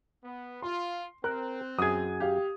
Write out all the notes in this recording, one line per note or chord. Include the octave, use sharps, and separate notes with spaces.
B3
F4 C6
C4 A#4 F#6
F#2 G#4 D#6 G#6
G4 F5